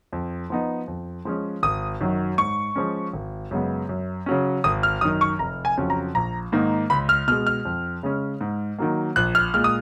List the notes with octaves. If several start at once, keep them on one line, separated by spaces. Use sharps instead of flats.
F2
F3 B3 D#4
F2
F3 G#3 C#4
G#1 D#6
F#2 D#3 F#3
G#2 C#6
F3 G#3 C#4
G#1
F#2 C#3 G#3 B3
F#2
C#3 F#3 C#4
G#1 D#6
F6
F#2 D#3 D#6
C#6
F1 A#5
G#5
F2 C#3 F#3 C#4
A#5
A#1 A#5
G#2 D#3 A#3 D#4
C#2 B5
F6
B2 G#3 F6
F6
F2
C#3 G#3 C#4
G#2
D#3 F#3 A#3
A#1 F#6
F6
A#2 G#3 F6
D#6